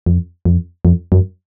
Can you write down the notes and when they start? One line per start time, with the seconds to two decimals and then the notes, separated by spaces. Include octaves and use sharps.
0.06 F2
0.45 F2
0.85 F2
1.12 F#2